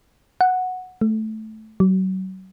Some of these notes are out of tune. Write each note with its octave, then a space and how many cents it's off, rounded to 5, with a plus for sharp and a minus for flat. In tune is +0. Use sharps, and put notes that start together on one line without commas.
F#5 -5
A3 -10
F#3 +30